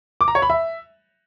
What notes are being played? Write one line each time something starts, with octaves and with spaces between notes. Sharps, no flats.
D6
A#5
C#5
B5
E5